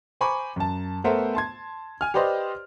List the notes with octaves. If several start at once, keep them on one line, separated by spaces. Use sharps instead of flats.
C5 G#5 A#5 B5 C#6 D6
F#2 A5
A3 B3 A4 A#4 C5 E5
A5 C6 G#6
G#5 F6
G4 B4 C5 D5 D#5 C6